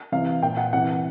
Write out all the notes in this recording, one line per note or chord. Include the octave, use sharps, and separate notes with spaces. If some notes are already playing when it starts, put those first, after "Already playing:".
C3 E3 F5
A#2 G5
F#5
C3 E3 F#5